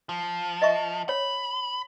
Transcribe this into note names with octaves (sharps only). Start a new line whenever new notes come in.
F3
D#5 E5 C#6
C#5 B5